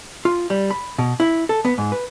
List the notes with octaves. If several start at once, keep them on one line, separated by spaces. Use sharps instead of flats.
F4
G3
B5
B2
E4
A4
B3
G#2
B4